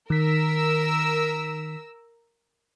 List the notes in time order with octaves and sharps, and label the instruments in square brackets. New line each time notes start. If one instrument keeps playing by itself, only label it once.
[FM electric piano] D#3 B6 [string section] A#4 E6